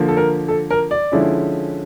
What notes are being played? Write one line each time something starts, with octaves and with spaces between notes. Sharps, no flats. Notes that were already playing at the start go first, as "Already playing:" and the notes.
Already playing: D3 F3 A#3
A4
A#4
A4
A#4
D5
D3 F3 G#3 C#4 E4